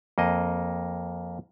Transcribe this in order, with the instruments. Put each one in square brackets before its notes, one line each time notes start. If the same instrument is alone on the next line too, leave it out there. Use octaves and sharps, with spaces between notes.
[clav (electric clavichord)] F2 A#3 D#5